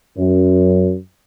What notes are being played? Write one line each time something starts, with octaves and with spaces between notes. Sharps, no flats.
F#2